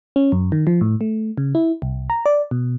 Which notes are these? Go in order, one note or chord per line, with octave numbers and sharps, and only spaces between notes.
C#4
F#2
D#3
F3
A2
A3
C#3
E4
C2
A#5
D5
B2